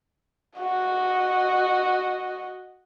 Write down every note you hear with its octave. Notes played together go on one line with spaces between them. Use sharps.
F#4 D#5